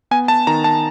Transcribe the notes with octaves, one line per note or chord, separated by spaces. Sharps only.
B3 G#5
A5
D#3 A#5
A5